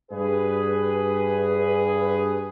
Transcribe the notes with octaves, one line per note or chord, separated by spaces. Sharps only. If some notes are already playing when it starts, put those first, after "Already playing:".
G2 G#4 B4